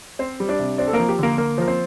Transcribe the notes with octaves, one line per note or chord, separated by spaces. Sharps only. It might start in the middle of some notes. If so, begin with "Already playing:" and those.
C4 C5
G3
D4 D5
C3
C4 D4 D5
A4
F3 A#3 A#4
G4
D3 A#3 A#4
A#3 A#4
F3 A#4
C4 C5